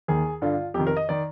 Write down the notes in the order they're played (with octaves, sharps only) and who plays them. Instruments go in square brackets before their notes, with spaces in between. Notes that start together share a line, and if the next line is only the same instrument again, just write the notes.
[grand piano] D#2 D#3 G#4
G2 D3 F4
F2 C3 D#3 G4
A#4
D#5
D#3 D5